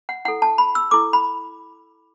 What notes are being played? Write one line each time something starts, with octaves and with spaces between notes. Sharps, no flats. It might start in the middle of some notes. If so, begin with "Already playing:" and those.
F#5
E4 A4 F#5
A5
B5
E6
E4 A4 D6
B5